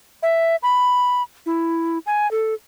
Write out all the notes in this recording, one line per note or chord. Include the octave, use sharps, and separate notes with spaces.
E5
B5
E4
G#5
A4